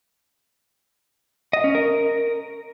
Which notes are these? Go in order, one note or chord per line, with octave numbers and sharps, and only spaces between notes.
D#5
C#4
A#4